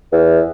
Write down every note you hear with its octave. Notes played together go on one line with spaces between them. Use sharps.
E2